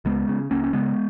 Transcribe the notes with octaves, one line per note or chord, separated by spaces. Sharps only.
C#2 G#3 B3
C#3
C#2 A#3 C#4
C#4
C#3 G#3 B3